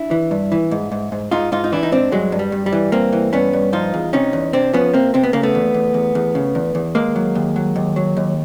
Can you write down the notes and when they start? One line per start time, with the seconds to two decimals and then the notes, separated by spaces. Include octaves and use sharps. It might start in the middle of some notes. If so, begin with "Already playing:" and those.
Already playing: D4 E4
0.11 E3
0.31 G2
0.52 E3
0.71 G#2
0.92 G#2
1.12 G#2
1.31 G#2 D#4 F4
1.52 G#2 D#4 F4
1.64 D#4
1.72 E3 D4 E4
1.83 D#4
1.92 G#2 C4 D4
2.12 G2 F#3 G#3
2.32 G2
2.39 G3
2.52 G2
2.66 G3
2.72 E3
2.92 G2 A#3 C4
3.13 E3
3.33 G2 B3 C#4
3.53 G2
3.73 F3 D#4 F4
3.94 E2
4.13 C3 C#4 D#4
4.33 E2
4.53 C3 C4 D4
4.73 F3 B3 C#4
4.94 C3 A#3 C4
5.14 C3 C4
5.23 B3
5.33 C#3 A#3
5.43 A3 B3
5.55 E2
5.74 E2
5.94 E2
6.15 E2
6.35 C#3
6.55 E2
6.75 E2
6.95 D#2 G#3 A#3
7.16 F#3
7.35 D#2
7.56 F#3
7.76 D#2
7.96 F#3
8.17 D#2